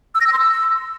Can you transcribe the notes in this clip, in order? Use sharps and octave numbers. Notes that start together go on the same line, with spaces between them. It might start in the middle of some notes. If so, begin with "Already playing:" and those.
E6
A#6
E6
C6
E6